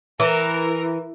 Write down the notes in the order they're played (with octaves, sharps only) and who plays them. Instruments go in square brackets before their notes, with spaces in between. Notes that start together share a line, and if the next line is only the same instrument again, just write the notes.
[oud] E3 [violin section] A#4